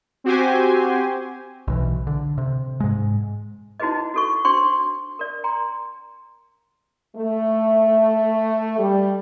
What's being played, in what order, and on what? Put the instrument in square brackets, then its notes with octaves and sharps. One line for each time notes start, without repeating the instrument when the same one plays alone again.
[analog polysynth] C4 F#4 G4 C5 G#5
[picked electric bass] B1 B2 E3
D3
C3
G#2 G#3
[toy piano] D#4 E4 F#4 G#4 B4 D#5
F#4 A4 C#6
D4 F#4 C5 G5 C6 C#6
A#4 D5
G5 A#5 C6
[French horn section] A3
G3